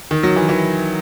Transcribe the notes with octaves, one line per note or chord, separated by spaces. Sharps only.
D#3
F#3
E3
E3